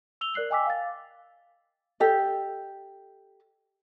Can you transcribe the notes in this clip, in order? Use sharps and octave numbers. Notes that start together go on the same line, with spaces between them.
E6 F7 G7
A#4 D5 F#6 C7 F#7
D#5 G5 G#5 D6 E6 B6
F5 A6
G4 A4 D#5